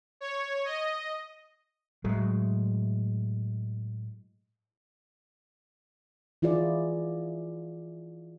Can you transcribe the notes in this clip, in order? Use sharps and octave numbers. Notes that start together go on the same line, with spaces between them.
C#5
D#5
A2 F#3 G#3 A3
E3 E4 F4 G#4 D5